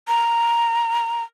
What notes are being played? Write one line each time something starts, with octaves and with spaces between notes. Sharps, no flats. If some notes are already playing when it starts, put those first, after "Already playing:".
A#5